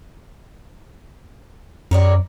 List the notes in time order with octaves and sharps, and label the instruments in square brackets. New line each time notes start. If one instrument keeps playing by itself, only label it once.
[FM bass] F#2 [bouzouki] A#4 C#5 D5